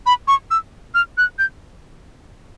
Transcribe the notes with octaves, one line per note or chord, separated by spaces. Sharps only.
B5
C#6
E6
F6
F#6
G6